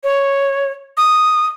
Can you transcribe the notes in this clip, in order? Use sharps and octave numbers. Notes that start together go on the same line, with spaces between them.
C#5
D#6